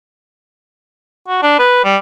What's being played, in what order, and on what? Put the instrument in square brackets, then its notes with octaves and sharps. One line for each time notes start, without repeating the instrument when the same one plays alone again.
[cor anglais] F#4
D4
B4
G3